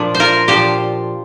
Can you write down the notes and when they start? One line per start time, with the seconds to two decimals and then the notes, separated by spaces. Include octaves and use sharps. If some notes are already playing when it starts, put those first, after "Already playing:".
Already playing: A#2 F3 D4
0.14 C5
0.20 F4 A#4
0.48 A#2 F3 D4 G4 C5